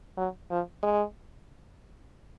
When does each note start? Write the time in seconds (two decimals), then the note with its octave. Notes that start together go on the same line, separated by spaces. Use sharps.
0.17 F#3
0.50 F3
0.83 G#3